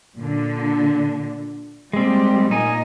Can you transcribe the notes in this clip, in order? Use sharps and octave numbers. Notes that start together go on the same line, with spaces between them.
A#2 D3
G3 G#3 A#3 C4 G4
A#2 D#4 D#5 G#5